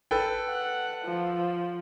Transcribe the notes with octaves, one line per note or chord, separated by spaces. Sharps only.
A4 B4 G5
F#5
F3